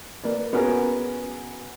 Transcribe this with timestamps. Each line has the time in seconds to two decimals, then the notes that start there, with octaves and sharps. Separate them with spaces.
0.24 A#3 B4 D5
0.53 B3 C#4 F#4 G#4 A#4